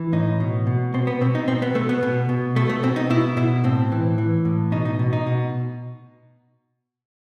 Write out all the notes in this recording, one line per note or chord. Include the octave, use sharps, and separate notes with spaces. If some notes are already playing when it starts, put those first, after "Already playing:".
Already playing: E3
A2 D#4
B2
B2
B2 C4
B3
B2 C4
D#4
B2 C4
B3
B2 A3
B3
B2
B2
B2 A3
A3
B2 C4
D#4
B2 E4
B2 E4
A2 C4
E3
E3
A2
B2 D#4
D#4
B2
D#4
B2